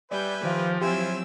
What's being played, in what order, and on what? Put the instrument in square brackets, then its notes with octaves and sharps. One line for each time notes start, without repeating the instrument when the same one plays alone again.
[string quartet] G3 G6 [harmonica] B4 E5 G#5 [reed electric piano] D5
[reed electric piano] D#3 F5 [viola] F3 [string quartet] G4
[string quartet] F#3 C4 E6 [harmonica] E4 C5 G#5 [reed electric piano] G4